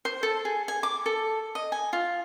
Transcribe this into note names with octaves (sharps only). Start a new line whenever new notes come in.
C5
A4
G#4
G#5
D6
A4
D#5
G#5
F4